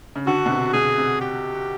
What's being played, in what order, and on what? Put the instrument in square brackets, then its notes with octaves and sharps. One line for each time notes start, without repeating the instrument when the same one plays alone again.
[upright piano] C#3
[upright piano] D3 [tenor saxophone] F#4
[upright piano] B2
C3
[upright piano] B2 [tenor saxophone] G#4
[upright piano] C3
[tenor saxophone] G4